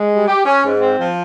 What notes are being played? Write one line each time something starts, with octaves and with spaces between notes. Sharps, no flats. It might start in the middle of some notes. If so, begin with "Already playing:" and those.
Already playing: G#3
G3
G4
C#4
G#2
C4
F3